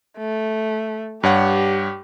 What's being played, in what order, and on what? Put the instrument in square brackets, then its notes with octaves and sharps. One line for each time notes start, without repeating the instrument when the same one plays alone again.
[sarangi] A3
[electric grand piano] G2 C#5 F#5 [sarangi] G4